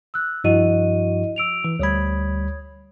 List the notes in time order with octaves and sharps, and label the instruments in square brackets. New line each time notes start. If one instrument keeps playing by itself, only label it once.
[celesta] E6 F#6
[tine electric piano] G2 F3 F#4 [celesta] E4 D#5 D#7
[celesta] E6 D7 F7
[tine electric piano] E3
[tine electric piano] D2 G3 B5 [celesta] C#5 D#6 G#6